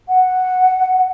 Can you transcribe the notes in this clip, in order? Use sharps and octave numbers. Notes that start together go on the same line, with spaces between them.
F#5